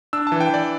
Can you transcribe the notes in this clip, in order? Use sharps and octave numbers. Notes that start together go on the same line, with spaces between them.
D4 E6
E3 A5
G5
E3 D5